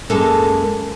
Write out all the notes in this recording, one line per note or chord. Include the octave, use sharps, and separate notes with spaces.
F#2 G#3 A#3 A4